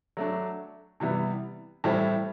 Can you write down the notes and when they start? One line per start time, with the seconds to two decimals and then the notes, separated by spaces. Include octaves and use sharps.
0.17 F#3 A3 D4
1.00 C3 E3 G3 B3
1.84 A2 E3 G3 C4 E4